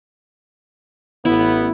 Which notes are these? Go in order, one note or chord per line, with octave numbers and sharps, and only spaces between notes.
A1 B3 E4